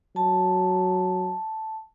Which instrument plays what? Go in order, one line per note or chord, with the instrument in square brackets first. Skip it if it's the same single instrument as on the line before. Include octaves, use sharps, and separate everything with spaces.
[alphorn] F#3 [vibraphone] A5